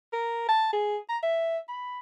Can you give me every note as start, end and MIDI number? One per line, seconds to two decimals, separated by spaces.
0.13 0.45 70
0.48 0.70 81
0.73 0.97 68
1.09 1.17 82
1.23 1.58 76
1.68 2.00 83